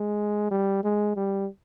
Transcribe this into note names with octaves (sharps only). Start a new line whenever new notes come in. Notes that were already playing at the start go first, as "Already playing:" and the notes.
Already playing: G#3
G3
G#3
G3